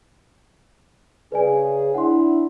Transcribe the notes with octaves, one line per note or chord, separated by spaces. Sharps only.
C#3 G#4 B4 D5 G#5
D4 E4 F#5 C6